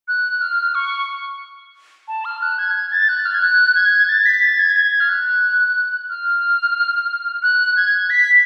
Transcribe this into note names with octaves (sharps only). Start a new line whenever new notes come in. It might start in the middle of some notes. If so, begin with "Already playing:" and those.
F#6
F6
C#6
A5
F6
F#6
G#6
G#6
A6
F#6
F6
G#6
F#6
G#6
A6
B6
A6
G#6
G#6
F6
F#6
F6
F#6
G#6
B6